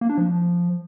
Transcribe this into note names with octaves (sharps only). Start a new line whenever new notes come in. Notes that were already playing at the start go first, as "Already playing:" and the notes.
A#3
D4
F3